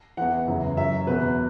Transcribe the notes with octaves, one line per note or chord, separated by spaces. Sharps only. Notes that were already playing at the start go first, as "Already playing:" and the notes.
E2 E3 F#5
F#2 C#3 E3
F#2 F#3 E5
E2 B2 F#3 B4